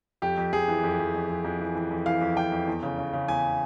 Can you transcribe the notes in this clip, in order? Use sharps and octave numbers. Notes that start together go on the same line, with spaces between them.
F2 G4
F2
F2 G#4
E3
F2
F2
F2
F2
F2
E3
E3
F2
E3 F5
F2
F2 G5
F2
E2
C#3
C#3
C#3
E2 G#5